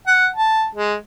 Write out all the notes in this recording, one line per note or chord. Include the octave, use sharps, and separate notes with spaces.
F#5
A5
G#3